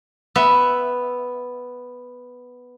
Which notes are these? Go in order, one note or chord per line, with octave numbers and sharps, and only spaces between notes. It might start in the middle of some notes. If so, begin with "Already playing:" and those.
B3 E5